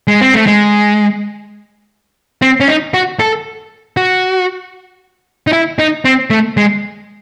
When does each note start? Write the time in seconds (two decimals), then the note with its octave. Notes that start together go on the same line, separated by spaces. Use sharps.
0.08 G#3
0.21 C4
0.34 A3
0.46 G#3
2.42 C4
2.60 C#4
2.68 D#4
2.94 F#4
3.19 A4
3.97 F#4
5.47 D#4
5.53 E4
5.79 D#4
6.05 C4
6.30 A3
6.57 G#3